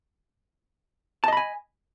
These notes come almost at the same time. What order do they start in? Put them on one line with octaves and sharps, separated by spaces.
A5 D#5 B5 G#5